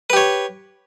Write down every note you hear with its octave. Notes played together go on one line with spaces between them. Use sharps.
G4 B4 C#5